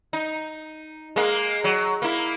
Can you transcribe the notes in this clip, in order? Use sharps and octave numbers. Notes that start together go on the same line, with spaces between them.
D#4
G#3 A#3
F#3
A#3 E4